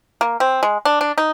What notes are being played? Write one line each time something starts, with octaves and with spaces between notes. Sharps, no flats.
A#3
C4
G#3
D4
D4
D#4